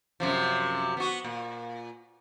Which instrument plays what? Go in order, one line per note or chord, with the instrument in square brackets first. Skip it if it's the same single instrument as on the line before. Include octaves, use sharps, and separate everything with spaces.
[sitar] F#2 C3 F3
B3 F#4
A#2